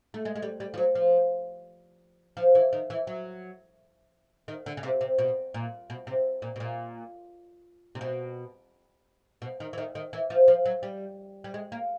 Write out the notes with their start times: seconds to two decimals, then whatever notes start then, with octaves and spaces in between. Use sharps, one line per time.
0.14 A3
0.25 G#3
0.35 G#3
0.42 G3
0.60 G3
0.74 F3
0.78 F#3
0.95 F3
2.37 F3
2.55 E3
2.73 D#3
2.90 E3
3.07 F#3
4.48 D#3
4.66 D3
4.77 C#3
4.83 C3
5.01 C3
5.18 B2
5.54 A#2
5.90 B2
6.07 C3
6.42 A#2
6.56 B2
6.60 A#2
7.95 C3
8.01 B2
9.42 B2
9.60 D#3
9.73 E3
9.78 D#3
9.95 D#3
10.13 E3
10.30 F3
10.48 F3
10.66 F#3
10.83 G3
11.44 G3
11.54 G#3
11.72 A#3